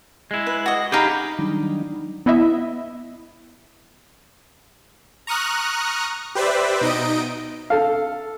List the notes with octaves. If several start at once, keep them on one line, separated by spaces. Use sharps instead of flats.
G#3 E4
B4
F#4 D#5
D#4 G4 G#4 F5 B5
D#3 F#3 G3 D4 D#4
B3 E4 D#5 E5
A#5 C#6 D#6 F6 F#6
G4 B4 C5 D5 E5
B2 D#4 D#5 D7
A4 F5